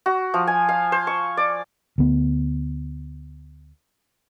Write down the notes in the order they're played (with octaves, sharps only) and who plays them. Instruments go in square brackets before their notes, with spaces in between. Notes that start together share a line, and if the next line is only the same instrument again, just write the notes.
[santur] F#4
F3
G#5
F5
C5
C#6
D5
[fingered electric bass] D2 B3